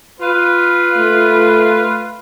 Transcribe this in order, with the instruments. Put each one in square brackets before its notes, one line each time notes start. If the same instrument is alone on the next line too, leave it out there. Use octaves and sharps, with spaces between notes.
[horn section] F4 B4
[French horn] A3